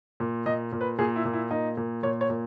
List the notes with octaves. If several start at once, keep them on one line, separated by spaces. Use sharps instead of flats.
A#2
A#2 D#5
A#2
B4
A#2 G#4
E4
A#2
E4
A#2 D#4
A#2
A#2 C#5
C#5
A#2